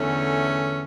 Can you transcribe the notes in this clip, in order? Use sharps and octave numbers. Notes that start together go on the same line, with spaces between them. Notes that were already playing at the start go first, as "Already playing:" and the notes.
Already playing: E2 D3 A3 C#4